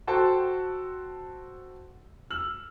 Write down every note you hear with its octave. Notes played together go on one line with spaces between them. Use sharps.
F#4 A4 C5 G5 A5 C6
E6 F6 F#7